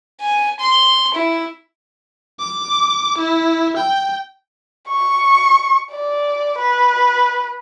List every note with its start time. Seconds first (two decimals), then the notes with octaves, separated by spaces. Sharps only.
0.21 G#5
0.60 C6
1.15 E4
2.39 D6
3.18 E4
3.77 G5
4.88 C#6
5.91 D5
6.58 B4